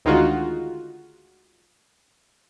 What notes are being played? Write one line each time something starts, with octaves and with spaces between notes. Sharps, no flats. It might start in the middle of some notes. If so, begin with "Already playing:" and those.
D2 D#3 G#3 D#4 F4 F#4